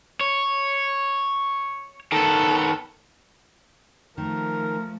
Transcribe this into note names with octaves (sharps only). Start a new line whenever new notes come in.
C#5
D#3 B3 A4
D#3 F3 A3 A#4